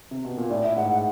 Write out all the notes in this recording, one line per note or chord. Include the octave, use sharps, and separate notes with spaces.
C3
B2
A#2
A2 D5
E5
G#2 F#5
F#5